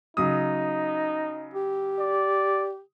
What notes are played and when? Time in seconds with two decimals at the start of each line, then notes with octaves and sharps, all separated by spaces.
0.17 C#3 F#3 D#4 D#6
1.54 G4
2.00 D5